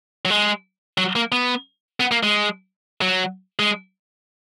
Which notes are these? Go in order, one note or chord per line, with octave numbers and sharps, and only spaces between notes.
F#3
G#3
F#3
A#3
B3
B3
A#3
G#3
F#3
G#3